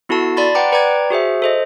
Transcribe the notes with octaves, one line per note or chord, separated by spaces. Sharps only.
B3 E4 F#4 A4 A5 C7
D5 A5 B5 C6 A6
B4 F#5 G5 A#5 D6
B4 D5 G5 A#5 D6 G#6
F#4 G#4 C5 E5
A4 C5 D#5